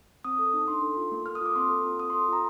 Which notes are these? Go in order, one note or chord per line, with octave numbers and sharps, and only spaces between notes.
C4 D#6
A4
D#4
D4 C6
A4
F4
A#3
A4 F6
D#6
F4 D6
C4 C6
A4
F4
C4 D#6
C6
A4
F4 A#5